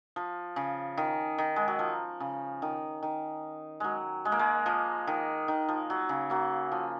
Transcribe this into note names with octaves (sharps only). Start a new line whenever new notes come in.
F3
C#3
D#3
D#3
G#3
F#3
F3
C#3
D#3
D#3
F#3 G#3
G#3
A#3
G#3
F3
D#3
D#3
F3
F#3
C#3
F#3 A#3
F3